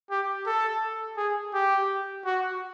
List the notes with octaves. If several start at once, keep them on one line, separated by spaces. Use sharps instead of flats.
G4
A4
G#4
G4
F#4